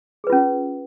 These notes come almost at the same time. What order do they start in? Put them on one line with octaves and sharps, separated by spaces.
G#4 B4 F4 C#4